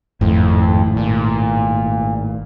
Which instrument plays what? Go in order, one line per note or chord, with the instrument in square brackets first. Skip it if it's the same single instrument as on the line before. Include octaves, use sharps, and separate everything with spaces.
[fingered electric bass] G#1 A2 [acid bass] F2
[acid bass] A#2